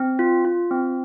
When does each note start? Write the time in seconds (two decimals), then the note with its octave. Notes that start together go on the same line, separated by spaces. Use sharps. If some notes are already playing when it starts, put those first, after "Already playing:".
Already playing: C4
0.19 F4
0.45 F4
0.71 C4